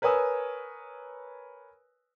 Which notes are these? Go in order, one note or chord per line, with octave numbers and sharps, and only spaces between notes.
A#4 B4 C#5 G#5 D#6 E6